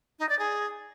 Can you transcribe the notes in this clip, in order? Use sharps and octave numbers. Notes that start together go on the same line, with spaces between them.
D#4
D5
G#4